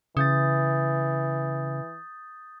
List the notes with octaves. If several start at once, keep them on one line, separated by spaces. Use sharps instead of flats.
C#3 E3 D#6 G6 A6